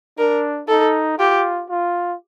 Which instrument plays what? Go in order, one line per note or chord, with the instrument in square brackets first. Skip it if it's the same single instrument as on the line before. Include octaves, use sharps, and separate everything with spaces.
[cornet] D4 [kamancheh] A#4
[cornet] D#4 [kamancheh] A4
[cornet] F4 [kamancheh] G4
[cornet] F4